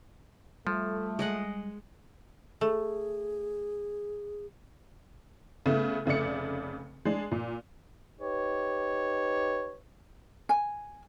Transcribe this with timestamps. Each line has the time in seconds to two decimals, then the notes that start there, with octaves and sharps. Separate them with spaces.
0.67 F3 G3 A3
1.19 G#3 D#5 F#5
2.61 A3 G#4
5.66 C#3 A3 B3
6.06 F1 C#3 A3 D5 C#7
7.05 G#3 D4
7.31 A#2
8.20 D#4 G4 B4 C#5
10.49 G#5